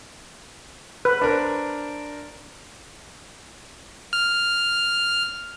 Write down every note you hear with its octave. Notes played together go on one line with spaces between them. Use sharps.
B4
D4 A#4 C5
F6